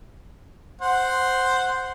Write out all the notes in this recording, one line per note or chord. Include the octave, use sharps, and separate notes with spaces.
C5 F#5